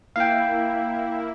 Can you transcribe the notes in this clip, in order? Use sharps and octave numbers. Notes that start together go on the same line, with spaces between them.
A#3 E4 F5 G5